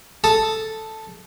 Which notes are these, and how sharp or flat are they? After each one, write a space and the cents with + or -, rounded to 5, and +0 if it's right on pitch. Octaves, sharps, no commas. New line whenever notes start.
A4 +0 A5 +0 D#6 +0